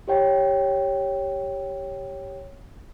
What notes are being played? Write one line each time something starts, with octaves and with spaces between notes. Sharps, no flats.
G4 C#5 G5